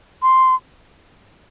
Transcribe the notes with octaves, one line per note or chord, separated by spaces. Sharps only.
C6